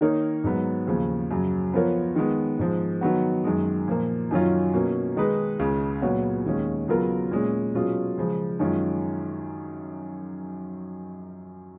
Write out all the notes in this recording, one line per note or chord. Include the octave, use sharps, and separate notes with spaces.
D#3 A#3 D#4 A#4 C#5
G#2 F#3 B3
D#2 C#3 F3
F#2 C#3 F#3
F3 B3 F4 A#4 C#5
D#3 G#3 B3
G#2 F3 G#3
D#3 F#3 B3 F#4
F#2 D#3 G#3
A#2 F3 A#3
F#2 D#3 F#3 C#4 F4
B2 A#3 C#4
D#3 G#3 D#4 G#4 B4
C#2 C#3 G#3
A#2 F#3 B3 F#4 C#5
D#2 D#3 G#3 C#4
C#3 F#3 B3 F4 A#4
A#2 G#3 C#4
B2 F#3 C#4 F4 G#4
C#3 F3 G#3
F#2 D#3 G#3 C#4 F4